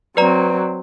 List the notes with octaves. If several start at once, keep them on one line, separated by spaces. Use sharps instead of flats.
F#3 C4 B4 D5 A#5